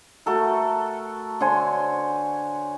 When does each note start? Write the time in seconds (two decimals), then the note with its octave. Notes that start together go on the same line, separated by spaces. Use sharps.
0.26 A3 F#4 A4 A#4
1.40 D3 C5 C#5 G#5